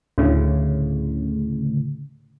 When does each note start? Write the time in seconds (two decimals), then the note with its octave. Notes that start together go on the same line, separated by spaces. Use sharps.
0.18 D2 A2 C#3